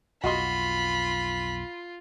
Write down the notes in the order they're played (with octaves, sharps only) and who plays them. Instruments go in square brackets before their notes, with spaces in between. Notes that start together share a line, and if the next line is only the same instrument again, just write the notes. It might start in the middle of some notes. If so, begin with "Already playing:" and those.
[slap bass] B1 F2 [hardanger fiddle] F4 [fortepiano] F#4 D#5 C6 [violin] B5